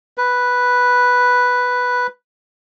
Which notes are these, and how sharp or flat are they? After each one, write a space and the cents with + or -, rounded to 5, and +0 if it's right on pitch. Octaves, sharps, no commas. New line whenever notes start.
B4 +0